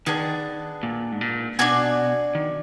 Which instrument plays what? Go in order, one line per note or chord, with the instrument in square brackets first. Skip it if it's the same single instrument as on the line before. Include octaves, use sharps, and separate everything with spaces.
[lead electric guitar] D#3 [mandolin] B3 D4 G#4
[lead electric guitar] A#2
G#2
A#2
[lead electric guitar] B2 [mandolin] D4 F#4 D5 G#5
[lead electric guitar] D#3